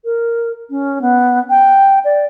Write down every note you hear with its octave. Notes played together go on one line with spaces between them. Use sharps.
A#4
C#4
B3
G5
D5